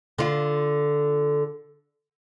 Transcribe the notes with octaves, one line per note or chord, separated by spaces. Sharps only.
D3 F4